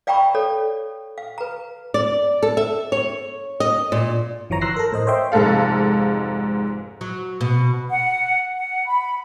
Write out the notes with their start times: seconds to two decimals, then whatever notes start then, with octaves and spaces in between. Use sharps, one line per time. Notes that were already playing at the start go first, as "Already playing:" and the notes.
0.07 D5 F5 G5 A#5 B5 C#6
0.35 A4 C#5 D5
1.18 F5
1.38 B4 A#5
1.94 D5
2.43 A4
2.57 E5
2.92 C#5
3.60 D#5
3.92 A#2
4.50 G1 E3 F3 C#5 A#5
4.61 A#5 C6 E6 F#6 A#6 C7
4.76 A4 A#4
4.92 A2 C5 D#5
5.07 C5 C#5 D#5 E5 G5 C6
5.32 F1 G#2 G#3 A4 F5
7.01 F#3
7.41 B2
7.89 F#5
8.57 F#5
8.86 B5